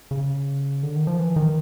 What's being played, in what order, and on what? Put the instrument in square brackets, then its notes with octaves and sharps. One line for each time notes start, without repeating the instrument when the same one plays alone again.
[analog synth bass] C#3
D3
D#3
F3
E3
D#3